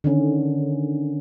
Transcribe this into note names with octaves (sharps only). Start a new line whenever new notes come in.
D3 D#3 C#4